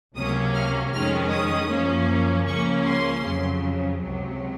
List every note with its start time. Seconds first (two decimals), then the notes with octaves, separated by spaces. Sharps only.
0.15 C#2 C3 F#3 A#3 C#4 D#6
0.54 F6
0.93 F2 D#3 G#3 C#4 F6
1.31 D#6
1.69 F#2 F3 A#3 C#4
2.46 C#2 C#3 F3 A#3 C#4 C#6
2.85 C6
3.23 F2 C#3 F#3
4.00 C#2 C3 F#3